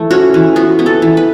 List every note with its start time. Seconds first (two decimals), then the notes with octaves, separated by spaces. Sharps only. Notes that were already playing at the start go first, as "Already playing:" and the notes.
Already playing: E3 A3
0.11 C#4 F#4
0.34 E3
0.56 B3 F#4
0.79 B3
0.86 A4
1.02 E3
1.17 B4